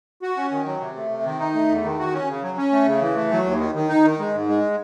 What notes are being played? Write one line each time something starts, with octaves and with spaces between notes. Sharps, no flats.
F#4
C#4
D#3
F#3
C3
A3
C3
D#3
D#4
A3
E2
D#3
F#4
C#4
C#3
F#3
C#4
A3
C#3
E3
A3
F#3
D#2
D#3
D#3
D#4
D#3
G#3
G#2
G#3